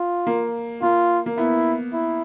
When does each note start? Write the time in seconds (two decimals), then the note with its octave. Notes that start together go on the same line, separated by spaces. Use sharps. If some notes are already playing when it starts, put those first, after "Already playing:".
Already playing: F4
0.27 A#3
0.82 A#3 F4
1.26 A#3
1.37 B3 E4
1.93 E4